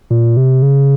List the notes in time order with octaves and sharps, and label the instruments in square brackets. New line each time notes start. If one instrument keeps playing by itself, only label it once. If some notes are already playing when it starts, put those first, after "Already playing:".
[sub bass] A#2
C3
C#3